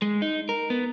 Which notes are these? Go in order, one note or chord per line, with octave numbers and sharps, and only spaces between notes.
G#3
D#4
A#4
B3